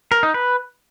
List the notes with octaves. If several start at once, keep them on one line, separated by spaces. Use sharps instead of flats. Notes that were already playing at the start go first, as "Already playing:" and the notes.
A#4
D#4
B4